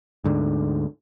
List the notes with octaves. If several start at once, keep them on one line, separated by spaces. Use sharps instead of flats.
D2 G#2 D3